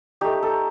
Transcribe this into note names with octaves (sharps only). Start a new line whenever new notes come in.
A3 D#4 G4
A4